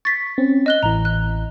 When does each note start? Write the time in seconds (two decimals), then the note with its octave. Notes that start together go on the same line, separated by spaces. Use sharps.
0.05 C#6 A6 B6
0.38 C4 C#4
0.66 D#5 F#6 G7
0.83 A1 E3 A#5
1.05 F#6